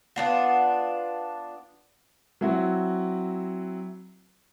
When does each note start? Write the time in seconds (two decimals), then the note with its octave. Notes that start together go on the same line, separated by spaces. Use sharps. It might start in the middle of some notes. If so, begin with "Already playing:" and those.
0.16 B3 D4 F4
2.41 F#3 C4 E4 F#4